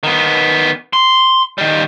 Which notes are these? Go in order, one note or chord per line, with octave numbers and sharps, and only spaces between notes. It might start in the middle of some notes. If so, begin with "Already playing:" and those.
D#3 B3
C6
D#3 G3